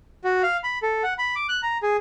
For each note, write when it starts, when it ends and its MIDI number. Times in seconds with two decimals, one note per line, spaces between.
0.24 0.42 66
0.43 0.57 77
0.64 0.79 83
0.82 1.03 69
1.03 1.14 78
1.18 1.35 83
1.36 1.47 86
1.49 1.61 90
1.63 1.78 82
1.82 1.97 68